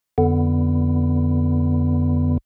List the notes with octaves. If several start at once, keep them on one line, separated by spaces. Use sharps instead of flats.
F2 D3 B3